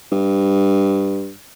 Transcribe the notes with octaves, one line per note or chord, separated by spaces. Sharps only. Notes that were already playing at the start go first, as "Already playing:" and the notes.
G2